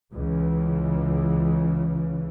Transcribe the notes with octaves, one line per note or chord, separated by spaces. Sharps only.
C#2 C#3 E3